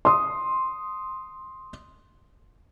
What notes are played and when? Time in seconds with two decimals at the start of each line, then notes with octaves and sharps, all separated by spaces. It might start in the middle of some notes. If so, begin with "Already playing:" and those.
0.05 C6 D#6